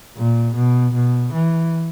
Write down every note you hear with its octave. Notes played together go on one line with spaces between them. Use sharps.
A#2
B2
B2
E3